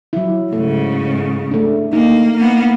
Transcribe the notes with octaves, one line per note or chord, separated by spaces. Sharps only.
F#3 E4
G#2 C#3 A3
A3 D4
A#3 D#4
A#3 B3